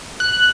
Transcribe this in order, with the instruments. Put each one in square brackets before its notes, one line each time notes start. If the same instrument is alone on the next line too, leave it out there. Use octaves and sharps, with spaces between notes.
[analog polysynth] F#6